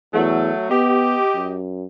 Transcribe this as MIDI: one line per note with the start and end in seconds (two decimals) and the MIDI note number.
0.14 0.52 40
0.14 0.65 54
0.14 0.65 57
0.70 1.19 59
0.70 1.57 67
0.70 1.57 75
1.35 1.87 42